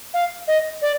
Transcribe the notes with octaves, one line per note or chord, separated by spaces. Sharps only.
F5
D#5
D5